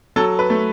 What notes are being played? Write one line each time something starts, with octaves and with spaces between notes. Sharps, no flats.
F#3 A4
B4
A3